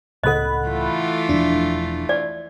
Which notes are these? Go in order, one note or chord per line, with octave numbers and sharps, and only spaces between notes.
C#2 A2 C#3 A4 D#5 F#5 B5 F#6
E3 A3 F4
E1 F3 D4
D5